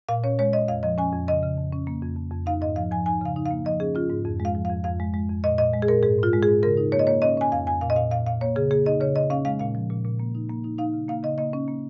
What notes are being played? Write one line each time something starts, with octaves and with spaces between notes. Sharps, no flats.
A#2 F5
C#4 C#5
G#3 C#5
G#3 D#5
F2 F5
F3 D#5
C#4 G#5
F2
C#3 D#5
C#3
F2
C#4
A#3
F2
F2
F2
D#4 F5
G#2 D#5
F3 F5
F3 G#5
D#4 G#5
C#3 F5
D#4
F5
A#3
F3 D#5
C#4 G#4
C#4 F4
G#2
F2
G#3
F5
F3
F5
F2
F2 F5
G#3
G#3
F2
A#2 D#5
A#2 D#5
G#3
G#4
A#2 A#4
G#2 G#4
G#2 F4
G#3
G#4
G#2
C#3 A#4
D#4
A#3 C#5
D#5
A#3 C#5
C#4 D#5
C#4 G#5
F2 F5
F2 G#5
A#2 F5
D#5
A#2 F5
A#2 F5
A#2 F5
A#3 C#5
C#3 G#4
A#3 G#4
D#4 D#5
C#3 C#5
C#3 D#5
C#4 F5
G#3 F5
A#2 F5
F3
A#2
A#2
A#3
D#4
A#3
D#4
D#4 F5
C#3
A#3 F5
C#3 D#5
A#3 D#5
C#4
A#3